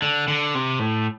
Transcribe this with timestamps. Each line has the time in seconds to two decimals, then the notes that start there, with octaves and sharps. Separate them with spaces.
0.02 D3
0.28 D3
0.55 C3
0.79 A2